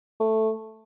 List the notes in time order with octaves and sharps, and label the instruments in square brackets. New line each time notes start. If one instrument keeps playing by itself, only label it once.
[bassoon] A3